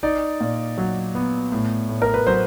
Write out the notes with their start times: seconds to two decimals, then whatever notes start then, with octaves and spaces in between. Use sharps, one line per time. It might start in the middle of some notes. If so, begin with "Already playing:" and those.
0.03 D#4 D5
0.40 A#2
0.78 F#3
1.15 B3
1.52 A2
1.89 A2
2.02 A#4
2.14 B4
2.27 F#3 C5